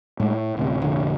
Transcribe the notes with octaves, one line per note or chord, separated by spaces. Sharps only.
A2 G#3
A2
D1 D2 C3
F1 A#1 D3